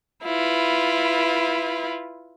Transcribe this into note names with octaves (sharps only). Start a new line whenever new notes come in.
E4 F4 B4